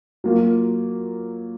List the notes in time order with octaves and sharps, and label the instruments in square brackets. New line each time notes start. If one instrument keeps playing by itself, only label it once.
[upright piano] F#3 A#3 F4